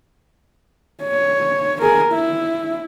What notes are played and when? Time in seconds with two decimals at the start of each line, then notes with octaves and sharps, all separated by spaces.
1.03 C#5
1.82 G#4 A#4
2.13 E4